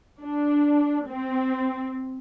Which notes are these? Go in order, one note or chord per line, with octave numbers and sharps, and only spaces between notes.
D4
C4